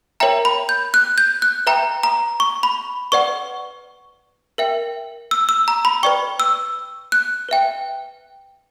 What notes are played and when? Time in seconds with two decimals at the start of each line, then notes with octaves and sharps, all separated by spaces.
0.20 A#4 C#5 E5 G5 A#5
0.45 B5
0.69 G6
0.94 F#6
1.18 G6
1.42 F#6
1.67 B4 E5 G5 A#5
2.03 A#5
2.40 C#6
2.63 B5
3.12 B4 D5 F#5 C#6
4.58 A#4 E5 G5
5.31 E6
5.49 E6
5.68 A#5
5.85 B5
6.03 B4 D5 G5 C#6
6.40 E6
7.12 F#6
7.49 B4 E5 G5